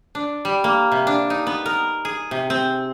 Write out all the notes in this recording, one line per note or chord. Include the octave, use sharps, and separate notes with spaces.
D4
G3
A#3
C3
D4
D#4
B3
A#4
G#4
C3
C4